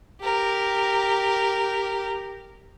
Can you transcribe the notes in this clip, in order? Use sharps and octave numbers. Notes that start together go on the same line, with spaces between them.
G4 A#4